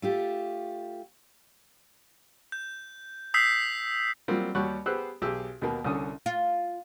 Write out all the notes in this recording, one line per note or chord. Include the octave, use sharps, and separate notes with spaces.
A3 F4 G4
G6
D#6 E6 G6 B6 C7
F#3 G3 A#3 C4 F4
D#2 G3 F#4 C#5 C#6 F#6
B3 G4 G#4 C5 E6 F#6
B1 G4 G#4 E6
D#2 B2 A#3
C2 D3 C#4 D#6
F4